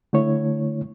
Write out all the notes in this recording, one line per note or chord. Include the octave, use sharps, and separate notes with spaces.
D3 A3 E4 C#5